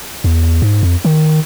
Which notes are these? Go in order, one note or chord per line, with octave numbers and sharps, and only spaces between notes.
E2
G#2
F2
D#3